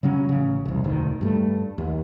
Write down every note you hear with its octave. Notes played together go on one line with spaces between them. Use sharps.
C#3 F#3 C#4
A1 C#3
E1 C2
E1 D2 D#3
G2 F#3 A3
D#2